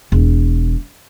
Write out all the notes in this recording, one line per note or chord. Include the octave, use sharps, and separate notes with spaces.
E1